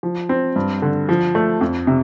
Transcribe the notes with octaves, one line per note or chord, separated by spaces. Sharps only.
F3
C4
G2
D3
F3
A3
F2
C3